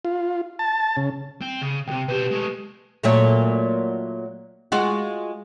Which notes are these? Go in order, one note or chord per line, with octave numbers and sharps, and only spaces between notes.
F4
A5
C#3
C4 G5
C#3
C#2 C3 G5
B2 G4 B4 C5
G#3 A3
A#2 F#3 A3
G#3 F4 F#4